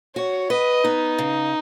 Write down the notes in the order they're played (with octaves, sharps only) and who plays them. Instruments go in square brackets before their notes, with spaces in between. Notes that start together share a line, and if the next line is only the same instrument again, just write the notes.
[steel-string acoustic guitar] F#4 [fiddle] C#5
[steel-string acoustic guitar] B4 [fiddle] D#5
[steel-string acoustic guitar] B3 [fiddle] D#4
[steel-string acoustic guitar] C#3